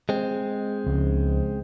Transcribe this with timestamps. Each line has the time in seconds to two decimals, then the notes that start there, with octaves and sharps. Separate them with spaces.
0.09 G#3 C4
0.86 C#2 C#3 F3